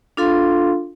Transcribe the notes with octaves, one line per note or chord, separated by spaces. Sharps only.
D4 F4 A4 F5 C6